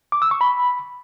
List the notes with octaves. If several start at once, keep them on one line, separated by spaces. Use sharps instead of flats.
D6
E6
C#6
B5